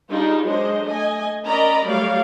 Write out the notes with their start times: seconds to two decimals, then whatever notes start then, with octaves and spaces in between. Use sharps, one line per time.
0.10 G3 D4 D#4 F4 G#4
0.44 F#3 G#3 D4 C5 D#5
0.85 A3 D#5 G#5
1.46 C#4 A#4 D5 D#5 A#5 B5
1.86 F#3 G3 A3 C#5 D5 F5